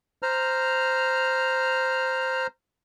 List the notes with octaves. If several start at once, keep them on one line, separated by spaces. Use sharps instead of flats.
C5 A#5 F6